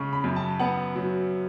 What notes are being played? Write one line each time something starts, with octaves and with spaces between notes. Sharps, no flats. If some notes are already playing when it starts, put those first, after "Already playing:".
Already playing: C#3 G#3 C#6
B5
F#2
A5
B3 F#5
F#3